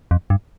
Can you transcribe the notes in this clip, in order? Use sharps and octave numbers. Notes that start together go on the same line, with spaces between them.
F2
G2